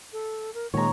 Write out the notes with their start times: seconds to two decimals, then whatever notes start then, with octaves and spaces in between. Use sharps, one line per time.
0.13 A4
0.54 A#4
0.74 A#2 D#3 G#3 C#5 A#5